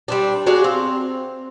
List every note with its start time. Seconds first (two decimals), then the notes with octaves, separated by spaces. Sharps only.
0.08 G3 C4 D4
0.46 D4 F#4 G#4 F5
0.64 C4